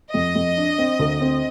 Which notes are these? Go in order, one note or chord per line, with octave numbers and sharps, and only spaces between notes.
F2 D#5
F2
D4
C4
D2
C4